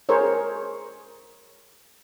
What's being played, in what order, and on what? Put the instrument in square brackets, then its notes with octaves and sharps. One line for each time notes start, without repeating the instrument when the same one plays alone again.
[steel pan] G#4 A#4 C5 C#5